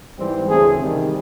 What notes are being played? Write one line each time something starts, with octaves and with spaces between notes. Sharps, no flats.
G#2 E3 G3 C4
D2 C#3 E3 A3 C4 G#4
C3 D#3 G3